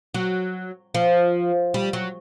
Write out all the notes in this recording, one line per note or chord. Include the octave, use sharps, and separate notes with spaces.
F#3
F3
G3
F#3